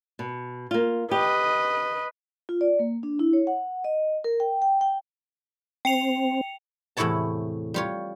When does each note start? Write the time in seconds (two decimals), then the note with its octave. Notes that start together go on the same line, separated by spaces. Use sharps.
0.19 B2
0.71 A#3 F4
1.11 G4 B4 D#5
2.49 F4
2.61 D5
2.79 A#3
3.03 D4
3.19 E4
3.33 C#5
3.47 F#5
3.84 D#5
4.24 A#4
4.40 G5
4.62 G5
4.81 G5
5.85 C4 G5 C#7 F7
6.97 E2 A2 C3 E4 C#5 A5
7.74 G3 F4 C#5